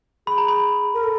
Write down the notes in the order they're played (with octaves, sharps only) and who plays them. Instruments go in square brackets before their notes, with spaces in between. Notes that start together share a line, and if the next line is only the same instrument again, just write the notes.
[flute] G#4 [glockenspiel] B5
[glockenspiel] A#5
B5
[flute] A#4
A4